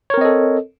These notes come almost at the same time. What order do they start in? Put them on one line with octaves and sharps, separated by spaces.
C#5 A#4 C4 D#5 A4